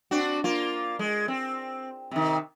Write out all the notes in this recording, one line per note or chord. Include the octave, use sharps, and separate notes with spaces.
C4 D4 F#4
A#3 F4
G#3
C4
C3 D#3